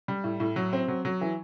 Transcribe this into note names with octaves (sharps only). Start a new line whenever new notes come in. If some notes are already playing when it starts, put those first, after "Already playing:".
G3
A2
A2
F#3
C4
F#3
F#3
E3